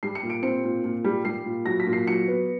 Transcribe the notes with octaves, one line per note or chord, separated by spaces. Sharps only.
G3 C7
C#7
A#2
D7
C4 C#7
A#2
A#2
G3
G3 C7
A#2
F#3 A#6
B6
A#2
C7
F#3 C#7
B3